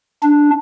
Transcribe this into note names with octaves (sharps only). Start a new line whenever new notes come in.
D4